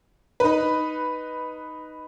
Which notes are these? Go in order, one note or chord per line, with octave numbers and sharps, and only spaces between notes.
D#4 B4